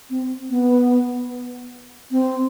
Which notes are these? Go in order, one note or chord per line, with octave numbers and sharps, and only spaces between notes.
C4
B3
C4